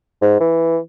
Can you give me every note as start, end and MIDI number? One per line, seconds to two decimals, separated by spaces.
0.22 0.37 44
0.40 0.78 52